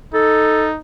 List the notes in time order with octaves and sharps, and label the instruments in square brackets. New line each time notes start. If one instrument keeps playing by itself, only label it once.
[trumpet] D#4 [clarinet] A4